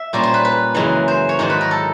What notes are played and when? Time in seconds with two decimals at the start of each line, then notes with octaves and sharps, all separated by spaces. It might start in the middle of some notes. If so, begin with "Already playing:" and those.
Already playing: E5
0.13 A#2 G3 A#3 C#4 C5
0.23 C5
0.34 B4
0.45 B4
0.75 F#2 C#3 E3 G#3 C#4
1.08 C5
1.29 C#5
1.39 G#2 D#3 F#3 C5
1.50 B4
1.61 A#4
1.71 A4